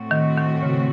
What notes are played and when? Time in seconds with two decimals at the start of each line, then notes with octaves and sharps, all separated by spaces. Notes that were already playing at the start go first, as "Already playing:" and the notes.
Already playing: A2 A3 C4 F#4
0.11 D#3
0.37 D#3
0.63 C#3